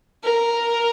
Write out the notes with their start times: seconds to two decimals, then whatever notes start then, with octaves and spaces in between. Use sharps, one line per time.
0.23 A#4